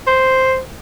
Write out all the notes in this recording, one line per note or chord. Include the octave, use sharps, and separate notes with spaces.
C5